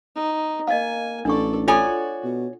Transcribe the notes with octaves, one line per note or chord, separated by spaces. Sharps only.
D#4
A#3 D#5 F5 G#5
A1 D4 A4 D5 C#6
F4 F#4 A4 C#5 D5 G#5
B2